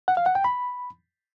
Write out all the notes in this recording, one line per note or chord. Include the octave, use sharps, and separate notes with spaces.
F#5
F5
F#5
G5
B5